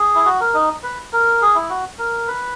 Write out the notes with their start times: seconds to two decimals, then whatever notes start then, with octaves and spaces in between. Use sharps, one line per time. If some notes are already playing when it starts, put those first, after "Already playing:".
Already playing: G#4
0.15 E4
0.25 F#4
0.40 A#4
0.54 D#4
0.83 B4
1.13 A#4
1.42 G#4
1.55 E4
1.70 F#4
1.99 A#4
2.28 B4